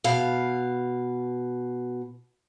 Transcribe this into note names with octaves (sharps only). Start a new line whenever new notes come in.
B2 F5